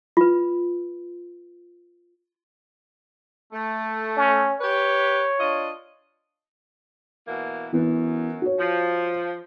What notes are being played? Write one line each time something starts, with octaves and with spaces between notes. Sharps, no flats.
F4 B4
A3
C#4
G4 B4 C#5
D4 F4 D#5
B2 E3 A#3
F#2 E3 B3
F#4 C#5
F3